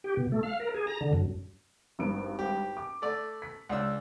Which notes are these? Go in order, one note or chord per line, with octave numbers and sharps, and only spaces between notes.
G4
B2
A3
F5
A#4
G#4
A#5
D3
F#2
G#1 G2 D7
G4
D6
A3 D5
B6
C#2 D4 E6